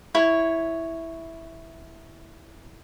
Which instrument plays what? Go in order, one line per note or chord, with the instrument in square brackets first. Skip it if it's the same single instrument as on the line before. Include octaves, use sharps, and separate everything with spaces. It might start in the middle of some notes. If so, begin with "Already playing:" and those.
[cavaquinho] E4 C#5